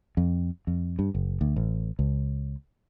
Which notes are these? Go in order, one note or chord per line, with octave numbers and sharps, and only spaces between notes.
F2
F2
G2
F#1
D2
A1
C#2